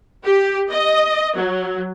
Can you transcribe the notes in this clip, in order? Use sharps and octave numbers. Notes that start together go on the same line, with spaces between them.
G4
D#5
F#3